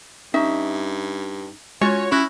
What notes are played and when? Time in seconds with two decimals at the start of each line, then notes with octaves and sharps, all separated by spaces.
0.34 G2 C#4 D#4 E5
1.81 G#3 C#4 F4 F#4 C#5
2.12 C#4 E4 C#6 F#6 A#6